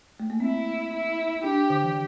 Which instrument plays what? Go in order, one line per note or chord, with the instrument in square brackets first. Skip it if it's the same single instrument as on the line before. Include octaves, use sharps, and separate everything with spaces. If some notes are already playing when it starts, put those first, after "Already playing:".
[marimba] A3
A#3
[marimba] C4 [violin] E4
[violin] E4
[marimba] D4 [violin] G4
[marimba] D3
E3